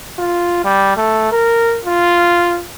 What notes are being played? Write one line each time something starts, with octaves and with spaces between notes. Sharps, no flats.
F4
G3
A3
A#4
F4